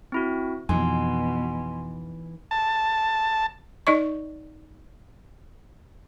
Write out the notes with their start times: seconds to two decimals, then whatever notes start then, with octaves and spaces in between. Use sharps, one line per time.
0.12 C4 E4 F#4
0.69 F2 B2 E3 D#4 G#5 C6
2.51 A5
3.87 D#4 D5 D#5 C#6